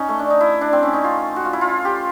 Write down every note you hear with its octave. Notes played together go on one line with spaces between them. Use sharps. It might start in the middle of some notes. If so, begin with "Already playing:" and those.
Already playing: C#4 D#4
A3
D4
D#4
E4
D4
C4
C#4
D#4
F4
F#4
F4
E4
F4
G4